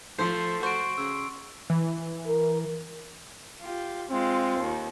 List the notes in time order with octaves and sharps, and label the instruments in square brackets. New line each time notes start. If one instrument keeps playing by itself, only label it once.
[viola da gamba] F3 [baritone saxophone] A3 [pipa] C5 [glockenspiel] C6 C7
[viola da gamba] F#4 [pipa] C5 [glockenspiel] C#6 D7
[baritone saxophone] C#3 [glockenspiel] E6
[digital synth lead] E3
[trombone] A#4
[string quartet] F4 G4
[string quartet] G#3 F4 [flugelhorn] C4
[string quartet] D#2